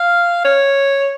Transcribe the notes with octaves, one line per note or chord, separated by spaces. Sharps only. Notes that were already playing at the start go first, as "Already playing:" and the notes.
Already playing: F5
C#5